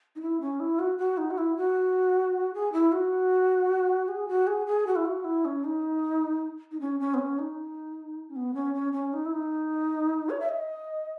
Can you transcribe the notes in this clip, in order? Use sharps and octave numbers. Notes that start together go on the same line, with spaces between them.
D#4
E4
C#4
E4
F#4
F#4
D#4
F#4
E4
F#4
G#4
E4
F#4
G#4
F#4
G#4
G#4
F#4
E4
F#4
E4
C#4
D#4
D#4
C#4
C#4
B3
C#4
D#4
C#4
B3
C#4
C#4
C#4
D#4
E4
D#4
C#5
E5
D#5